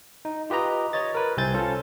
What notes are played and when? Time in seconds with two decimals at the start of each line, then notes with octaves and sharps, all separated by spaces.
0.25 D#4
0.50 F4 G4 B4 D#5 A#5
0.93 C#5 D#5 A6
1.14 A#4 B4 C#5
1.37 C2 C3 C4 G#5 G6 A6
1.54 C#4 F4 A4